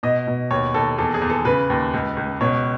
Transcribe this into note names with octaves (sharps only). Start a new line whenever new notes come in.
B2 D#5
B2
D#2 C#5
D#2 A4
E2 A4
G#4
E2
A4
C#3 B4
D#2
C#2
C#2
B2 C#5